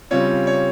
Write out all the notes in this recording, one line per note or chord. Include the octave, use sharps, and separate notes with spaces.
C#3 G3 C4 F4 C#5
C#5